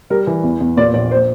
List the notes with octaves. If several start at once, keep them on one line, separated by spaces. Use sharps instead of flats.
G3 A#4
E3
E2
E2
A#2 D5
A#1 D5
C5